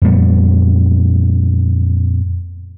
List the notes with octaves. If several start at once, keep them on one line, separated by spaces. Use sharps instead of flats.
F2 A#2 G3 B3